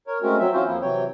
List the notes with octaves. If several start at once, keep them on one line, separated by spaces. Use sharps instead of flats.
A#4 C#5
G#3 A3 C4 C#4 F#4 A#4
F#3 C4 E5
E3 C4 C#4 F4 F#4 C5
F2 F3 A#3 E4
C3 E3 F#3 C#5 G5